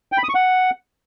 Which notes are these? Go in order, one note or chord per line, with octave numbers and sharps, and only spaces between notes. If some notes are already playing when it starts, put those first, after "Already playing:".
G5
B5
D#6
C#6
F#5